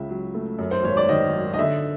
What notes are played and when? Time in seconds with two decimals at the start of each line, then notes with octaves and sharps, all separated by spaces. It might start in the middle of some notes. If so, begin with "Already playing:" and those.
Already playing: C#2 C#3 E5
0.09 F#3
0.34 A3
0.59 F#2
0.71 C5
0.84 G#1 C#5
0.97 D5
1.09 D#3 D#5
1.33 F#3
1.54 D#5
1.59 D3 E5